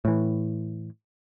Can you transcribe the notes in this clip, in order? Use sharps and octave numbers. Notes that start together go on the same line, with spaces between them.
A2 E3